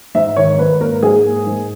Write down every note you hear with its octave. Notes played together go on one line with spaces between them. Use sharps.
G#2 E5
D#3 C#5
G#2 B4
A#3 A#4
G#2 G#4
A#3
G#2